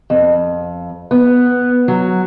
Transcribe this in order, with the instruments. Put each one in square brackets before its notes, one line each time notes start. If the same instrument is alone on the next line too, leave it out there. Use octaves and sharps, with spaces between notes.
[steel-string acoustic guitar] F2
B3
F#3